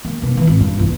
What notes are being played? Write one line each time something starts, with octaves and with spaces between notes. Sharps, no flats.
A#3
B1 A#3
D#3 E3
G#1
G2
A#1 E2